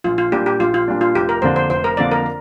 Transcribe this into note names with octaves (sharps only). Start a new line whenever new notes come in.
A#1 F4
F4
A#2 G3 D4 G4
G4
A#1 F4
F4
A#2 G3 D4
F4
F1 G4
A#4
F2 D3 A#3 D4 C5
C5
F1 C5
A#4
F2 D3 A#3 D4 D5
A#4